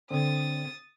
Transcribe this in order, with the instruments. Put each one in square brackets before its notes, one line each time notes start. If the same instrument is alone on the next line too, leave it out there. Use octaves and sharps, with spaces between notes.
[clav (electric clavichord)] D3 C4 [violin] D#6 A6